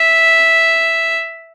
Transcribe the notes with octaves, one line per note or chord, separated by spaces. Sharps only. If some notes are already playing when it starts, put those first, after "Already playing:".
Already playing: E5